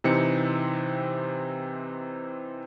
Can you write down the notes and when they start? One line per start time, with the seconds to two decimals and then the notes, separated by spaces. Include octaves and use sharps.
0.04 C3 E3 C4 D#4 C#7